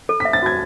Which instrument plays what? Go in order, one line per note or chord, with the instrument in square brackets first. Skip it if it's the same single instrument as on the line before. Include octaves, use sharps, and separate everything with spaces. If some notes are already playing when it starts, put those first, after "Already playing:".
[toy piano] A4
[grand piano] B6
[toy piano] E5
[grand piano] A6
[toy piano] F#4 [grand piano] G#6